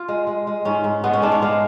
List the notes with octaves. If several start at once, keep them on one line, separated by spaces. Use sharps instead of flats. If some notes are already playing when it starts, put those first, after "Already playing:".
Already playing: F4
G#3
G#3
G#3
G#2 C#4
G#2
G#3 B3
C#4
G#2 D4
C#5
G#3 F5